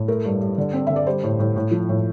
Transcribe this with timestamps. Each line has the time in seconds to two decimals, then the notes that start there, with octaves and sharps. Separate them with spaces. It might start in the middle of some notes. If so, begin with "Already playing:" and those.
Already playing: A2
0.08 A3 A#4
0.25 G2
0.41 G2
0.58 D3
0.73 C4
0.87 D3 E5
0.96 D5
1.07 G3 C5
1.23 A2
1.39 A2
1.56 A2
1.71 F3
1.89 A2